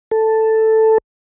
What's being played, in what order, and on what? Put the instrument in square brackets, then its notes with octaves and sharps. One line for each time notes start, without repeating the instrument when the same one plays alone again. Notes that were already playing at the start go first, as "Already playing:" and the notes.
[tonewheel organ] A4